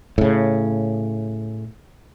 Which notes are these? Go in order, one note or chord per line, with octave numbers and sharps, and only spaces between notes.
A2 C#3